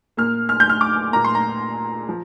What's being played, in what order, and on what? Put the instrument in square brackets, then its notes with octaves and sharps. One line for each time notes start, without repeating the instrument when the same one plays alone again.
[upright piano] A#2 A#3 F6
F6
G6
F6
D6
A#2 A#3 A#5
C6
A#5
F3